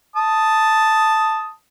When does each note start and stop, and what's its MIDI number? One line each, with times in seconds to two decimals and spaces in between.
0.16 1.52 81
0.16 1.52 87